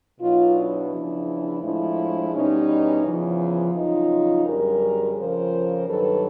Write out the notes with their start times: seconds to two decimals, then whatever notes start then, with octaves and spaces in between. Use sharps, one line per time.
0.20 B2 F#3 D#4 F4
0.54 D4 E4
0.90 E2 C#3 F3
1.61 A2 F3 G#3 D4 E4
2.32 E2 B2 G3 C#4 D#4
3.04 E2 C#3 F3
3.74 F2 C#3 F#3 D#4 F4
4.45 F#2 D3 G3 G#4 A#4
5.16 F2 C#3 F3 A#4 C5
5.87 G2 D#3 F#3 A4 B4